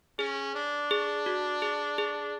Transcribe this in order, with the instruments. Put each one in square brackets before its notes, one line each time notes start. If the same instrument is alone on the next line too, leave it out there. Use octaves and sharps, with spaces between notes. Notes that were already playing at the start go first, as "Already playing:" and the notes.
[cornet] C#4 [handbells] G#4
[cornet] D4
[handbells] G#4
F#4
G#4
G#4